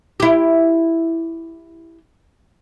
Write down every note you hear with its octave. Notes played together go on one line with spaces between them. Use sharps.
E4 G4